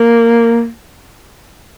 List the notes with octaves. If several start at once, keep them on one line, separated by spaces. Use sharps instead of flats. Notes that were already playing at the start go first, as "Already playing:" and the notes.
Already playing: A#3